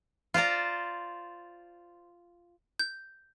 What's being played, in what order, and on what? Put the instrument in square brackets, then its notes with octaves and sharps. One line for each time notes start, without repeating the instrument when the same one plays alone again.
[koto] F4 C5 D5 A#5
[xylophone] G6